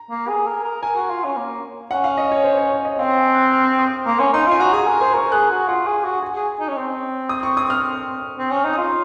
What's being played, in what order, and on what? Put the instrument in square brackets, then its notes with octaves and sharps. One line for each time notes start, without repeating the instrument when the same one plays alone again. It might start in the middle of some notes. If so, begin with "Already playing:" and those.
Already playing: [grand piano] A#5
[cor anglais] A#3
G#4
A#4
A#4
[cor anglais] A#4 [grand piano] G#5
[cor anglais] F#4
F4
C#4
A#3
[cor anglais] C#4 [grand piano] F#5
[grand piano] F5
D#5
C#5
C5
C#5
C#5
D#5
[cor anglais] C4 [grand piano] F5
[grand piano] G#5
F#6
F6
D#6
[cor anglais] A#3 [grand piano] C6
[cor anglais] C#4
[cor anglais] D#4 [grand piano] C6
[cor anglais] F4 [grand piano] G#5
[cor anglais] F#4 [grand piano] A#5
[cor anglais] G#4 [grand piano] G#5
[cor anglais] A#4
[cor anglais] C5 [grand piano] G#5
[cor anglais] A#4 [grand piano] C#6
[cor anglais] G#4 [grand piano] F#6
[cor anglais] F#4
[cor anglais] F4 [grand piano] F#5
[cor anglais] G#4
F#4
[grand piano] G#5
[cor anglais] G#4
D#4
C#4
C4
[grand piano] D#6
C#6
D#6
F6
[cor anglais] C4
C#4
[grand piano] F6
[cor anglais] D#4
[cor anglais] F4 [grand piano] D#6